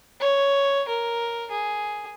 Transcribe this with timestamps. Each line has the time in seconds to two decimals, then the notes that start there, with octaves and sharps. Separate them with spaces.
0.20 C#5
0.88 A#4
1.51 G#4